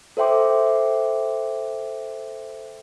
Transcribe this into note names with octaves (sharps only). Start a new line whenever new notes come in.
A4 C5 E5 G5 C6 D6